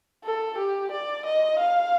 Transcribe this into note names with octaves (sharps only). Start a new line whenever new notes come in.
A4
G4
D5
D#5
F5